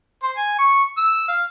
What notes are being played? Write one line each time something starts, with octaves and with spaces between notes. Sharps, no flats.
C5
G#5
C#6
E6
F5